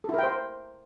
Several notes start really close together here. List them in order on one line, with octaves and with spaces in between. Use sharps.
A4 E4 A#4 G5 C5